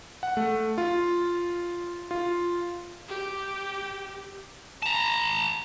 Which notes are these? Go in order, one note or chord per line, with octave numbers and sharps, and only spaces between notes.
F#5
A3
F4
F4
G4
A5 A#5